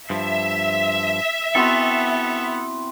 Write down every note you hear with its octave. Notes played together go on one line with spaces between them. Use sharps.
G2 F3 E5
B3 C4 E4 F#4 A4